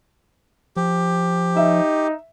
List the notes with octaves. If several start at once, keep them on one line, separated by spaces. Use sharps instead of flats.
F3 G4
D#4 E5